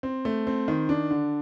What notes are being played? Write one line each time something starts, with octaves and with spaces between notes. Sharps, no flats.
C4
A3
C4
D#3
D4
D3